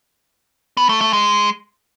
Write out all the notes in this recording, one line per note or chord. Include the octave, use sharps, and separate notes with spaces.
B3
A3
A3
G#3